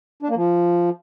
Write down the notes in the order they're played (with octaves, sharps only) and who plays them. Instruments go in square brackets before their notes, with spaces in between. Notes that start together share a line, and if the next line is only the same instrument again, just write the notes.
[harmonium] D4
A#3
F3